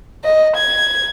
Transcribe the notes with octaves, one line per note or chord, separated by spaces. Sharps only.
D#5
G#6